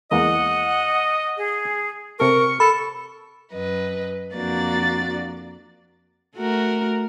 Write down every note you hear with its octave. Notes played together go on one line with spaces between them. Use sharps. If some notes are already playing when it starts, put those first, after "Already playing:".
E2 G#3 A#3 D#5 F#5
G#4
C3 A4 A#4 C#6
A4 B5
F#2 B4 D#5
F2 A#3 D4 F#4 D5 A6
A3 F#4 A#4